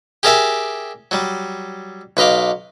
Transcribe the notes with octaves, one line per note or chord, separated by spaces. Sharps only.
G4 G#4 A#4 D5 E5 G#5
F#3 G3
B1 B4 D#5 F5 D6